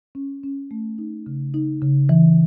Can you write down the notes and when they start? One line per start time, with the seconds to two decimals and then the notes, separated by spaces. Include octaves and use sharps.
0.15 C#4
0.43 C#4
0.71 A3
0.98 D#4
1.26 C#3
1.54 D#4
1.82 C#3
2.09 E3